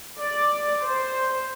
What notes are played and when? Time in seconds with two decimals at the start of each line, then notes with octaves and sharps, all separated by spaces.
0.18 D5
0.83 C5